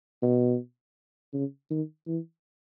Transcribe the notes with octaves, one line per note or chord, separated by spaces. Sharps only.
B2
C#3
D#3
E3